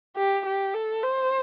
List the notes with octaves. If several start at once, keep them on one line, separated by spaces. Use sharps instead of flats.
G4
G4
A4
C5